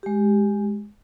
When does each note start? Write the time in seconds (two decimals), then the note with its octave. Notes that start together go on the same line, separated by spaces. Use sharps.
0.03 G#3 G4